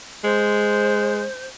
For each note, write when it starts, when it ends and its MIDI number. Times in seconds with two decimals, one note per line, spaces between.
0.24 1.25 56
0.24 1.45 72